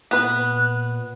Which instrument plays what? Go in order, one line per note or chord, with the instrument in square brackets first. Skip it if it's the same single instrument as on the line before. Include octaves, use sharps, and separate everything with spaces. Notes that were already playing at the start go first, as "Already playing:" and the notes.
[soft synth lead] A#2 [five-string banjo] B3 B4 [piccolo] F#6